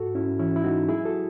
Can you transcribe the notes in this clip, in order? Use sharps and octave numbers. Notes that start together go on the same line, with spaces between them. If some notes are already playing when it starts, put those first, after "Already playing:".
Already playing: G#2 F#4 A4
G#2 C#4 E4
E3 C#4 E4
E4
G#3 D#4 F#4
F#3 E4 G#4
F#4 A4